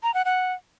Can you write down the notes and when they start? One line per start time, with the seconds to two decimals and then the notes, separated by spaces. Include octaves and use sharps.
0.03 A#5
0.14 F#5
0.25 F#5